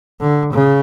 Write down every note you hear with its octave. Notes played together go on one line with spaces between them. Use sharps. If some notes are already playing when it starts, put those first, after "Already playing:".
D3
C#3